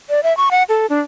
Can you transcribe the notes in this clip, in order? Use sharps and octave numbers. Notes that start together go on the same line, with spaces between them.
D5
E5
C#6
F#5
A4
D4